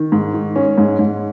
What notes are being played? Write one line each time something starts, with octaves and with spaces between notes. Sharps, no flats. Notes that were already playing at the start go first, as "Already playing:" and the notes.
Already playing: D#3
G#2
D#3
C#4
G#2
G#2